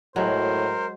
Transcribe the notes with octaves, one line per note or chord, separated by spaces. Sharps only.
A2 F#3 G#3 A#4 C5